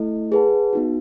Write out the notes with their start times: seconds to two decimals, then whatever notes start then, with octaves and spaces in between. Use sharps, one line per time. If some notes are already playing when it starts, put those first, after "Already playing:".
Already playing: A3 E4 A4 D#5
0.32 G#4 B4 F#5 A5
0.73 B3 D#4 F#4